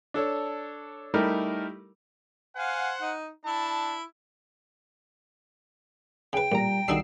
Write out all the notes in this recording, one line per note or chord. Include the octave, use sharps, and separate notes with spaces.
D4 A4 C#5
G3 A3 D#4 E4 G4 A#4
C5 F5 F#5 G#5
D#4
D4 E4 A5
C#3 B4 G5
A1 A#2 G3 A#5
B1 D#3 G3 D4 D#4 F#4 E6 C7